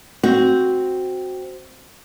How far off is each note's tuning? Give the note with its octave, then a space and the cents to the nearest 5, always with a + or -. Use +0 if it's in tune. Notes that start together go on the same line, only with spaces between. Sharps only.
C4 +0 F#4 +0